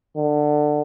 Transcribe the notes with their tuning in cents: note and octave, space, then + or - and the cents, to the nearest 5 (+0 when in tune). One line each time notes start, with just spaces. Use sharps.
D3 +20